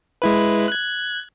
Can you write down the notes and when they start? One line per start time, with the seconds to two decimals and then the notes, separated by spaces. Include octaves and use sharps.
0.22 G#3 E4 B4
0.68 F#6 G#6